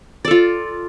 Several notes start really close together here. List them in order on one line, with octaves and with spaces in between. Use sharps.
D5 A4 F4